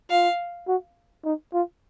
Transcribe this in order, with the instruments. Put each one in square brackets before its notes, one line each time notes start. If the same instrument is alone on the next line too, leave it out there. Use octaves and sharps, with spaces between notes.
[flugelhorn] F4 [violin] F5
[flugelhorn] F#4
D#4
F4